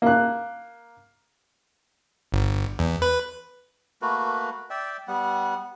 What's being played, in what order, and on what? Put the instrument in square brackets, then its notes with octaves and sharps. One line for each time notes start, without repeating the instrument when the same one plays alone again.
[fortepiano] A#3 F#6
[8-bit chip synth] G1
E2
B4
[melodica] A3 A#3 F#4 B4
D5 E5 G5
G3 B3 F#5